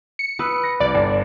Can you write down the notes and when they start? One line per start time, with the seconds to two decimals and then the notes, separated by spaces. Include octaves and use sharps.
0.19 C#7
0.39 B4 D#6 E6 F#6
0.64 A#6
0.80 C2 D5
0.94 G1